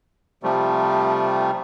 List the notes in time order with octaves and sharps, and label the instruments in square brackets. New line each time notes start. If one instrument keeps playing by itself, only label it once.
[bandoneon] C3 F3 G3 A3